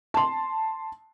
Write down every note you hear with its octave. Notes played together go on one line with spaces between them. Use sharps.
A5 C6